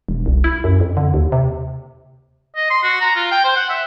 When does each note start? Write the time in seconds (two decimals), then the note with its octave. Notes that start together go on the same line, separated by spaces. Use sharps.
0.09 E1
0.26 C2
0.44 E4
0.64 F#2
0.80 F2
0.97 D3
1.14 D#2
1.32 C3
2.55 D#5
2.70 C6
2.83 F#4
3.01 A#5
3.15 F4
3.31 G5
3.44 C5
3.56 F#5
3.70 E5